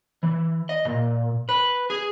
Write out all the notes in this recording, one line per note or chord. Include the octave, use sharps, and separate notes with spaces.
E3
D#5
A#2
B4
G#4